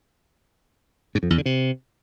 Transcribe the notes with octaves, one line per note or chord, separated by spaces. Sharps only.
G#2
F2
E2
D3
C3